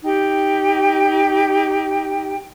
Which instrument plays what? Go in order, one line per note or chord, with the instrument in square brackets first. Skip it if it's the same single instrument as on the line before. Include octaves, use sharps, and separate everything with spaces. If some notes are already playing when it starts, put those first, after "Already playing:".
[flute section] D#4 G4 G5